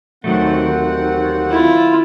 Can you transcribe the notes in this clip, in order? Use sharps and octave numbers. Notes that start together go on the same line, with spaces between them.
D#2 D#3 F#3 A3 C4 F#5
E4 F4